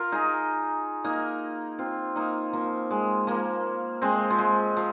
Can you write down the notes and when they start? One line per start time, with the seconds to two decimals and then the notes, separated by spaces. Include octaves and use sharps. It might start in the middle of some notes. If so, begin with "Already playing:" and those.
Already playing: F4 A#4
0.12 D#4 G#4
1.04 A#3 D#4
1.79 C4 F4
2.16 A#3 D#4
2.53 F3 A#3
2.91 G#3
3.27 F3 A#3
4.02 G#3 C4
4.30 F3
4.39 G#3
4.77 F3